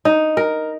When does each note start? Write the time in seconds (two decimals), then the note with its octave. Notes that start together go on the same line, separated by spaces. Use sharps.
0.05 D#4
0.37 A#4